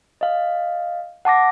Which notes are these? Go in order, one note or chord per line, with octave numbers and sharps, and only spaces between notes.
D#5 F5
F#5 A5 D6 A#6